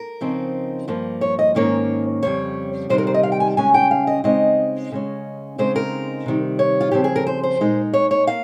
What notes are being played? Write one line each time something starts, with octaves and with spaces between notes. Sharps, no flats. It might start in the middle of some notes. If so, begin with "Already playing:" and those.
Already playing: A#4
C#3 F3 C4 D#4
G2 F3 A#3
C#5
D#5
G#2 D#3 A#3 C#4 C#5
F2 C#3 G3 C#5
C3 D#3 G3 C5
A#4
C5
D#5
F5
G5
G#5
C#3 G#3 C#4 G#5
G5
F5
D#5
C#3 G#3 C4 D#4 D#5
C#3 G#3 C#4
C#3 G#3 C4 D#4 C5
A#4
C3 D#3 G3
C#5
F4
C#3 F3 C4 G4
G#4
A#4
C5
C5
A#2 G#3 D#4
C#5
C#5
A#3 F5